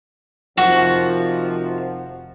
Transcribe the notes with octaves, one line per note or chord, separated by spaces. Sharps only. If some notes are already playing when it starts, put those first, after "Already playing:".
F1 C3 D#3 F3 F#4